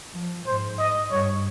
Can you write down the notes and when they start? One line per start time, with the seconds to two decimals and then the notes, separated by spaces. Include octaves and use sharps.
0.14 F3
0.47 G#2 C5
0.79 D#5
1.11 G2 C#5